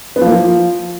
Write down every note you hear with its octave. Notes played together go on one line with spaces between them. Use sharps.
B3
F3
A#3
F3